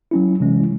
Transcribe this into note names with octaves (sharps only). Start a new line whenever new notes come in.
F#3 C#4 E4
C3 E3 G#3 C#4